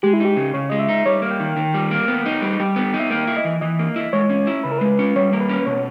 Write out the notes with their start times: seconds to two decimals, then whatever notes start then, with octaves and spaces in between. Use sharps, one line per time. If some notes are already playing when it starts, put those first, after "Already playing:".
0.03 G#3 G4
0.13 E4
0.20 D#4 G4
0.37 C#3
0.54 C#3 C#5
0.70 G#3 D#5
0.79 E5
0.89 D#4
1.06 G3 C#5
1.22 A#3
1.31 G5
1.40 D#3
1.57 D#3
1.74 G3
1.91 A#3
2.08 B3
2.26 D#4
2.42 G3
2.60 G3 G5
2.76 B3
2.94 D#4
3.00 E5
3.10 A#3 G5
3.27 E4
3.37 D#5
3.45 E3
3.61 E3 D#5
3.79 A#3
3.96 E4
4.13 G#3 C#5
4.30 C#4
4.47 E4
4.64 C#3 B4
4.72 A#4
4.78 G#3 B4
4.99 C#4
5.16 G3 C#5
5.33 A#3
5.41 B4
5.49 C#4
5.66 B2 C#5